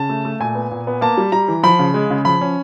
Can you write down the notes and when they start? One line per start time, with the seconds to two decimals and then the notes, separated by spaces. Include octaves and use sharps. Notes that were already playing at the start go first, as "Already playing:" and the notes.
Already playing: C#3 A5
0.09 A3
0.25 A3
0.40 A#2 G#5
0.55 B3
0.71 A#2
0.87 B3
1.01 A#3 A5
1.17 G3
1.32 G3 A#5
1.48 E3
1.63 F3 B5
1.79 C#3
1.94 G#3
2.10 C#3
2.25 F3 B5
2.41 C#4